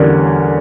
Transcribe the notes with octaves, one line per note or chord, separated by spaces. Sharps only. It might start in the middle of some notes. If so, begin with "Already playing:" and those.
Already playing: E2 D3 G3 C#4 A#4 D5